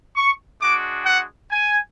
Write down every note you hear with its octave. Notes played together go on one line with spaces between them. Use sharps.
C#6
G#3 D4 F#4 D6
F#5
G#5